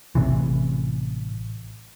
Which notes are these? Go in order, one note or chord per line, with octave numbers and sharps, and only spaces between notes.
A1 A2 C3 E3